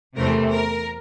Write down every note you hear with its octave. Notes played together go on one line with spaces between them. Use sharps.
E2 C3 E3 A3 C4 A#4
A#4